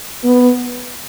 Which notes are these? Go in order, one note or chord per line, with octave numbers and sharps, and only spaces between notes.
B3